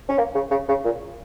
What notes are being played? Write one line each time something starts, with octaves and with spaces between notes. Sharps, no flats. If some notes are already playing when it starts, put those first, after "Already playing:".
C#4
A#3
C#3
C#3
C#3
A#2